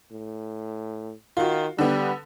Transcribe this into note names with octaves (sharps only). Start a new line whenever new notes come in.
A2
D#3 F4 F#4
D3 G3 B3